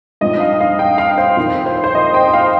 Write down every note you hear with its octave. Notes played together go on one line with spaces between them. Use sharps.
G2 F3 C4 D#4 D#5
F5
F5
G5
F5
C5
F2 D#3 C4 D#4
C5
C5
D#5
G5
G5
F5